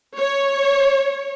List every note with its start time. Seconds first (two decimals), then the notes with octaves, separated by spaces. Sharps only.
0.17 C#5